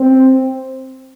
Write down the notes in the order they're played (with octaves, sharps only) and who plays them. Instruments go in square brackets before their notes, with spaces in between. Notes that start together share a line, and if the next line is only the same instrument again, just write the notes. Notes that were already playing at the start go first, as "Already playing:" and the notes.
Already playing: [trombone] C4